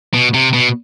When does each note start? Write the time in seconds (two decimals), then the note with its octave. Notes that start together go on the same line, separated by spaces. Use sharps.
0.14 B2
0.34 C3
0.53 B2